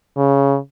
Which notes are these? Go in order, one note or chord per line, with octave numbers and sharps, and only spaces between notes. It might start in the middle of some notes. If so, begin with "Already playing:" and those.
C#3